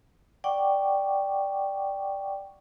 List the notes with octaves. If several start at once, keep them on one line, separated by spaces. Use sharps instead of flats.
D5 F#5 G5 C#6 D6